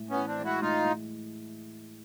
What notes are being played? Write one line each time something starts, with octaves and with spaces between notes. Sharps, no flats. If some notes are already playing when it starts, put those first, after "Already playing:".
Already playing: A2
B3 C#4
E3
C4 D4
G#3
E4 F#4
A2 D#4 F4
A2